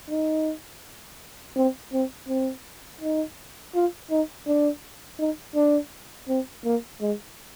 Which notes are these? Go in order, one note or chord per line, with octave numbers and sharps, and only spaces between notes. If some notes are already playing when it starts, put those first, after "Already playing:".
D#4
C4
C4
C4
D#4
F4
D#4
D4
D#4
D4
C4
A#3
G#3